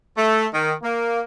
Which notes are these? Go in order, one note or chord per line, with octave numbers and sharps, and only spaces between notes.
A3
D#3
A#3